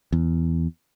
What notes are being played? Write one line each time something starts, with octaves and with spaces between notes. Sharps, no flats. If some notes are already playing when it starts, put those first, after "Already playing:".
E2